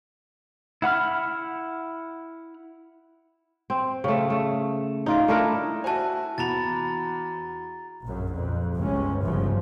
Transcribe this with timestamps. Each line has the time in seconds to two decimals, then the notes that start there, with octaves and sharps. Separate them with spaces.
0.82 E4 F#5 B5 F6
3.70 C4
4.04 C#3 A3
4.30 A3
5.06 D#4 F4 D5
5.28 A3 D4 E4 A#4
5.84 E4 F#4 C5 G#5 A5
6.38 E2 E4 F#4 A#5 B5 A6 F7
8.03 A#1 F#2
8.34 F2
8.75 G1 C#2 C3 G#3 C#4
9.21 G1 C2 C#3 E3 F3